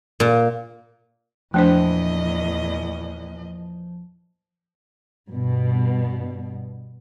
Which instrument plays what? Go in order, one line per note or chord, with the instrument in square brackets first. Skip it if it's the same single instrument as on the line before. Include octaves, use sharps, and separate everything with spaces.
[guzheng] A#2
[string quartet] E2 A#2 D#5 [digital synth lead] F3 [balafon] A3 D4 C5
[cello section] G2 B2